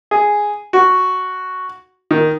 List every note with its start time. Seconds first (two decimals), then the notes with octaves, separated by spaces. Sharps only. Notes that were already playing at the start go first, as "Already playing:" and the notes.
0.11 G#4
0.73 F#4
2.11 D#3